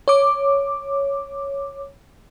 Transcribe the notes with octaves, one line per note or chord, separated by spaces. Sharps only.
C#5 D6